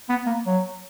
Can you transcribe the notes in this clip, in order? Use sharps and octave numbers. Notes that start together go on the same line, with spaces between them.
B3
A#3
F#3